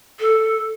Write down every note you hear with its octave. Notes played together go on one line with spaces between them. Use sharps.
A4